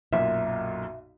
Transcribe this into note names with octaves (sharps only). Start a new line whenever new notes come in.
B1 F#2 A#2 E5